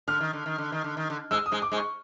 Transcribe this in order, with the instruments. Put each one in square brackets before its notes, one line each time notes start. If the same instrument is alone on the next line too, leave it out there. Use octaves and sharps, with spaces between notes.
[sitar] D3 [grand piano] F6
[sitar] D#3
D3
D#3
D3
D#3
D3
D#3
D3
[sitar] G#2 G#3 [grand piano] E6
[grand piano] D#6
[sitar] G#2 G#3
[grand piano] D6
[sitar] G#2 G#3
[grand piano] C#6